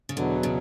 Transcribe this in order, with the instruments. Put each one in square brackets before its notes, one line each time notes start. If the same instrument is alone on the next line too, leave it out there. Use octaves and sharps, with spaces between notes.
[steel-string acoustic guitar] C#3
[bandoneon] E2 B2 F#3 [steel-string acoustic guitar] D3
[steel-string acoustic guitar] C#3